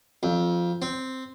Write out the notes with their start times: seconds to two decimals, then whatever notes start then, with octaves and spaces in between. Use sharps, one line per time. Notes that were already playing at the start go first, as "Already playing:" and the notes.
0.23 F2
0.82 C4